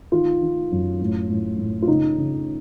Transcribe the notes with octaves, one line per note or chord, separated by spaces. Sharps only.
D#3 F4
D#3
F#2
A2
A2
A2
F4
C#3 D#4
C#3